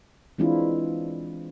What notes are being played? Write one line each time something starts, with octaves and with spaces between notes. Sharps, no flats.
E3 G#3 C4 D4 E4 F4